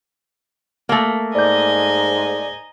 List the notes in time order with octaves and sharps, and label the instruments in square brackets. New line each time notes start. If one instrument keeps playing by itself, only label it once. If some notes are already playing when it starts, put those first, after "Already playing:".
[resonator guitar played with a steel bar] A3 A#3
[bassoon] G#2 [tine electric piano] D5 G6 [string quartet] D#5 G#5 A#5